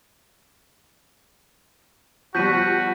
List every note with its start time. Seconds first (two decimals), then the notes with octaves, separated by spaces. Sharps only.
2.35 F3 G3 B3 F#4 C#6 G6 B6 D#7